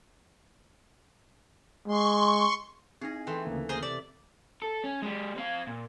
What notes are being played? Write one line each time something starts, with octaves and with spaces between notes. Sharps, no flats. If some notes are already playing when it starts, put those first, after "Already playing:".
G#3 C6 C#6
C4 D#4 E4 G#4 D#5
E3 A3 B3 G5 C6
D2 C#3 A#3
G#4 A#4 C5
C3 D5 E5
A4
C#4
G#3 G4
C4 F5
A#2